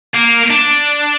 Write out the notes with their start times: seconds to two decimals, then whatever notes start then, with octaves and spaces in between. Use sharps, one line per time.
0.14 A#3
0.50 D4